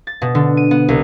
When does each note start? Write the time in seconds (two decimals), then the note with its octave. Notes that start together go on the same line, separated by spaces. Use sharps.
0.07 A6
0.22 B2
0.35 D3
0.57 D#7
0.71 B3
0.88 C2